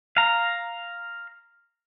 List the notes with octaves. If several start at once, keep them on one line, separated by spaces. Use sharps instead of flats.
F5 A#5